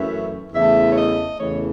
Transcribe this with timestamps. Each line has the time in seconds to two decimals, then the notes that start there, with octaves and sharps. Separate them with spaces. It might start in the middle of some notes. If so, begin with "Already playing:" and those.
Already playing: F#2 E3 A3 E5
0.53 E2 C#3 E3 A3 E5
0.91 C#5
0.96 D#5
1.39 E2 C#3 E3 A3 C#5